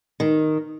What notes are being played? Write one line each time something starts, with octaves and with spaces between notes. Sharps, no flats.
D#3